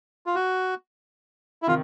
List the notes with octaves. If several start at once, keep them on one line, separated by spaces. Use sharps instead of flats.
F4
F#4
E4
C3 D#3 F4